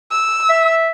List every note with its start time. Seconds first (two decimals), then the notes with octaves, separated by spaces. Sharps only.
0.11 E6
0.49 E5